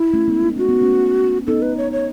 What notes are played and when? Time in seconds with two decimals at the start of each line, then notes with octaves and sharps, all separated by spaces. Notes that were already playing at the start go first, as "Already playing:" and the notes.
Already playing: E4
0.14 A3 C#4
0.28 G#3 B3
0.43 D#4
0.56 C#4 F#4
0.69 B3
0.81 A3 C#4
1.47 B3 D#4 A4
1.62 B4
1.77 C#5
1.92 C#5